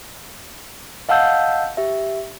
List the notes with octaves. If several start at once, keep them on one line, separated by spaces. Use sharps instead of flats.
D#5 F5 F#5 A5 E6 G6
G4 E5